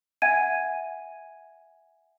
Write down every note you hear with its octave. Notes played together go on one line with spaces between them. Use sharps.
E5 F#5 G#5 G#6 D#7